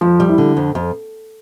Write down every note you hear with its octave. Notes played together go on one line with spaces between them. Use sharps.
F2 F3
G3
E4
D3
F2
F2